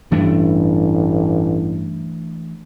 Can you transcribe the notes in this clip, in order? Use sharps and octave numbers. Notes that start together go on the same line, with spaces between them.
A1 G2 E3 A3 D4